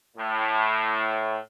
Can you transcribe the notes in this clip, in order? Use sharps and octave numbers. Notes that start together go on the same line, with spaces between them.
A2